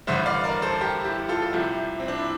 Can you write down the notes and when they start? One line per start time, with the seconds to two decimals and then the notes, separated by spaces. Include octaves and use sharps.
0.07 A1 G2 D3 A3 C5 E5
0.26 D5 F5
0.44 A#4 D5
0.62 A4 C5
0.81 G4 A#4
1.04 E4 G4
1.29 F4 A4
1.42 A4
1.53 C2 C3 F3 A3 E4 G4
2.00 C4
2.08 D4
2.18 E4